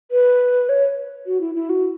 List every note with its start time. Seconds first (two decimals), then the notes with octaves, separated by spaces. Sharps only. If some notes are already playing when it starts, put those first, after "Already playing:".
0.11 B4
0.69 C#5
1.26 F#4
1.40 E4
1.55 E4
1.69 F#4